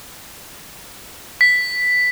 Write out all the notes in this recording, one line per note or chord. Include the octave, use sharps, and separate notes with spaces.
B6